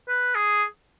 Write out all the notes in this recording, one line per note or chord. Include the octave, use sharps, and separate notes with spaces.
B4
G#4